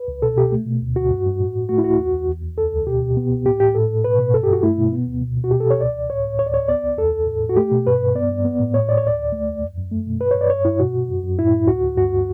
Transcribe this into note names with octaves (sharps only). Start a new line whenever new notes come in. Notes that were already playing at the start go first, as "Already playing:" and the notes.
Already playing: B4
C#2
B2 A4
B2 G4
A3
B2
D2
D2 F#4
G2
G2
A2
A2
A3 F#4
E4
C#2 F#4
E2
E2
E2
E2
D2 A4
D2
B2 G4
B2
B3
C#2
A2 G4
A2 G4
A2 A4
A2
B2 B4
B2
G2 A4
G4
G2 F#4
A3 E4
B2
B3
D2
B2
B2
F#4
B2 G4
A4
B2 C#5
C#2 D5
C#2
A2 C#5
A2
D2 C#5
D5
D2 C#5
B3 D5
C#2
E2 A4
E2
A2
A2
F#4
A3 G4
B2
G2 B4
G2
B3 D5
G2
B3
A2
A2 C#5
A2 D5
C#5
D2 D5
D2
A3
E2
F#2
F#2
A3
B2
G2 B4
G2 C#5
D5
G2 C#5
G2 E4
B2 F#4
B2
F#2
F#2
A2 E4
A2
D2 F#4
D2
G2 F#4